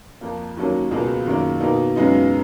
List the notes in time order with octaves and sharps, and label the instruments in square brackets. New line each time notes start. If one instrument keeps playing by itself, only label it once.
[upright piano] F2 F3 A#3
D#2 D#3 F#3 A#3 C#4
C#2 B2 A#3 F4 G#4
F#2 D#3 A#3
B2 A#3 D#4
F#2 C#3 G#3 B3 D#4